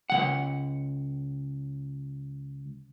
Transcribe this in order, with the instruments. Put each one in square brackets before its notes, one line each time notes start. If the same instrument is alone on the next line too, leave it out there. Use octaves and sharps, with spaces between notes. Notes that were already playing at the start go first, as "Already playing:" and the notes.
[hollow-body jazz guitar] C#2 D#3 F#5